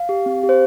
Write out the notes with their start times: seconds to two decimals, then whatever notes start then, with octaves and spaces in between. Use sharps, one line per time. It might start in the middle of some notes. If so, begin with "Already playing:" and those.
Already playing: F5
0.09 G4
0.26 C4
0.43 G4
0.49 C5